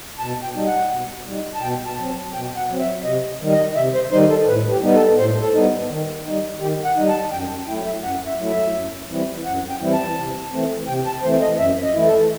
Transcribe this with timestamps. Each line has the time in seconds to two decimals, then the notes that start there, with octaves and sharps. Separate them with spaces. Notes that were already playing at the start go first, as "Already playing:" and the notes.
0.19 B2 A5
0.43 G5
0.55 G3 D#4
0.67 F#5
0.91 B2
1.26 G3 D#4
1.55 A5
1.61 B2 G5
1.86 A5
1.98 F#3 C4
2.09 A5
2.34 B2 G5
2.56 F#5
2.69 F#3 C4
2.80 E5
3.04 C3 D#5
3.41 D#3 G3 D#4
3.53 D#5
3.76 C3 E5
3.94 C5
4.12 D#3 G3 D#4 C5
4.29 A4
4.47 A2 B4
4.70 G4
4.83 G3 B3 D#4
4.95 A4
5.18 A2 C5
5.41 A4
5.54 G3 B3 D#4
5.89 D#3
6.25 G3 D#4
6.60 D#3 G4
6.85 F#5
6.96 G3 D#4
7.09 A5
7.32 F#2 G5
7.67 F#3 A3 E4 G5
7.85 E5
8.03 F#2 F#5
8.26 E5
8.39 F#3 A3 E4
8.51 E5
8.74 F#2
9.09 E3 G3 C4 E4
9.45 F#2 F#5
9.69 G5
9.81 E3 G3 C4 E4
9.93 A5
10.17 C3
10.52 E3 A3 C4
10.87 C3 G5
11.06 A5
11.23 E3 A3 C4 C5
11.41 D#5
11.59 F#2 E5
11.83 D#5
11.94 E3 A3 E4
12.07 A4